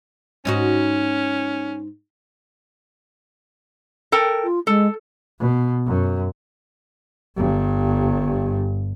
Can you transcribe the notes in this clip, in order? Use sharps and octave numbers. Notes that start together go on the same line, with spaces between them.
G#2 C#4 D#4 F#4
A4 A#4 G5
F4
G#3 A4
B2
F#2
G1 G2